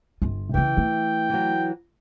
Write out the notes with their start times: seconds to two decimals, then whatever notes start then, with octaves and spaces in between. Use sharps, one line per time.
0.22 G1 F4
0.54 C#3 E3 C#4 G5
0.77 A3
1.30 E3 F#3